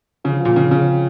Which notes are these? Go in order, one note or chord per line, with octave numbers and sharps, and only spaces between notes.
C#3 F3
A#2 F3
C#3 C4
C#3 F4
C#4